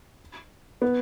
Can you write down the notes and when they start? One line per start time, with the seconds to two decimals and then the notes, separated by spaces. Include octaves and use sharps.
0.82 B3